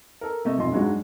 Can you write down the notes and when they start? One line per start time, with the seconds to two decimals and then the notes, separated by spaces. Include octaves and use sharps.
0.21 A4 A#4
0.45 C3 A3 D#5
0.58 B1 F2 D#5 C6
0.72 G2 F#3 G#3 D#4 F#4